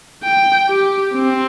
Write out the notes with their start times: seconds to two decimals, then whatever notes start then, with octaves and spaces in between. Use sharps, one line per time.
0.24 G5
0.69 G4
1.14 C4